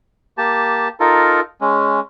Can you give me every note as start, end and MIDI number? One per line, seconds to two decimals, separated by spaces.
0.38 0.89 58
0.38 0.89 67
0.38 0.89 81
1.00 1.40 63
1.00 1.40 65
1.00 1.40 69
1.00 1.40 70
1.61 2.00 56
1.61 2.00 61